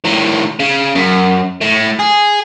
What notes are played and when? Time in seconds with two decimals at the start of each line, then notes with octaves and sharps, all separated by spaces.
0.04 A2 D#3
0.59 C#3
0.95 F#2
1.62 A2
2.00 G#4